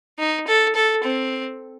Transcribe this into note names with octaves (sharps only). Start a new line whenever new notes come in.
D#4
A4
A4
C4